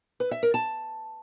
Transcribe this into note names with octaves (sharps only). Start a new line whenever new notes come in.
B4
E5
A#4
A5